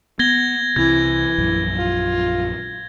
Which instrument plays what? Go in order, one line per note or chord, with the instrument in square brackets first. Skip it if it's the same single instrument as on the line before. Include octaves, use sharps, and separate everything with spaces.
[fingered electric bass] B3 [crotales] G#6 A#6 G7
[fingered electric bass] C2 C3 [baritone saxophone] E3 [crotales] G#6
[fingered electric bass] A#1 F#2
[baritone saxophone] F4